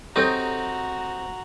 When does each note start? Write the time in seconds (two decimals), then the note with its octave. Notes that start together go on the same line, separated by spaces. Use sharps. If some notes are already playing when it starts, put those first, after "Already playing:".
0.16 C4 D#4 F#4 G4 A4 C#5 A#5